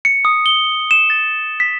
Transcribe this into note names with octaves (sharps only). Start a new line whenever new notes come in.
C#7
D#6
G7
E7
A6
B6